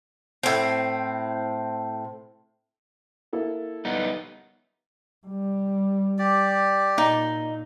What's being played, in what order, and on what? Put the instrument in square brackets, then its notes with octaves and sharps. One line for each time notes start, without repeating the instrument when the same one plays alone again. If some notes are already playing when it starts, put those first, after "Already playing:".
[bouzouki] A2 C4
[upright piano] A#3 E4 A4
[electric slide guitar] G3 B3 D#4
[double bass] G3
[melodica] G4 D5
[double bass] A#2 [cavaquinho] D#4